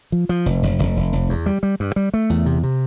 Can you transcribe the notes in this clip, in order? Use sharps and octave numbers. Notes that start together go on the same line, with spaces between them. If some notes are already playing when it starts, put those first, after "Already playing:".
F3
F3
F1
F1
F1
F1
F1
E2
G3
G3
G2
G3
A3
E2
C3
C3